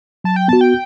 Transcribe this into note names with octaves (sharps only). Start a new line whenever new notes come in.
F#3 A5
G5
B3 F#4 A5
G5